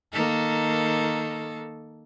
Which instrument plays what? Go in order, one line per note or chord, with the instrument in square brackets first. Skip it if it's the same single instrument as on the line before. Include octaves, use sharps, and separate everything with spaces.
[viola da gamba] D#3 A#3 A4